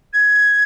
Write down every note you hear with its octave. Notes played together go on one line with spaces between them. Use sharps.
G#6